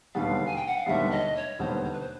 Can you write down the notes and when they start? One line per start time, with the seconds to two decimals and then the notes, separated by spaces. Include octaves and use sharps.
0.14 E1 D#2 D3 G3 B3 F5
0.46 G#5
0.56 G5
0.66 F#5
0.76 F5
0.86 E1 D#2 D3 G3 B3 E5
1.11 D#5
1.36 C#5
1.59 E1 D#2 D3 G3 B3 C5
1.84 C5
1.92 B4
2.00 C5